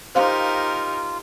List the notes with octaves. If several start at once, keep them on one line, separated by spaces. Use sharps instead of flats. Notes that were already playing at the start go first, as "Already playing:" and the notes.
D#4 F4 G4 A#4 C5 F5 C6